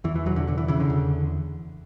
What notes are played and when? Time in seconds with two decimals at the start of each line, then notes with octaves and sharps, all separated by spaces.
0.04 E2 E3
0.16 E3
0.26 E1 F#3
0.36 D3
0.48 E1 D3
0.58 E3
0.68 C#3 E3
0.80 D3
0.90 E2